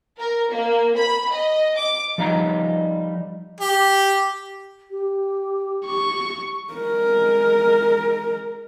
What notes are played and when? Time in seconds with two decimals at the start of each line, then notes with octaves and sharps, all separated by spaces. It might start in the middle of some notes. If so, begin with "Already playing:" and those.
0.19 A#4
0.50 A#3
0.98 B5
1.33 D#5
1.76 D6
2.18 F3 G3 D#4 A#5
3.61 G4
4.91 G4
5.87 C#6
6.73 G#3 A#4